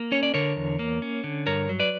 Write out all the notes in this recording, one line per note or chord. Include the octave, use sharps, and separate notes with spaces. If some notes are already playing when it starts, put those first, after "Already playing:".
Already playing: A#3
C#4 C#5
D5
D3 A#4 C#5
E2
A#3
C#4
D3
G2 A#4 C#5
F#3
B4 D5